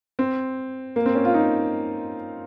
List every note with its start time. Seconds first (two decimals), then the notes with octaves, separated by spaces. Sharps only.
0.19 C4
0.96 A#3
1.06 C4
1.15 C#4
1.25 F4
1.34 D#4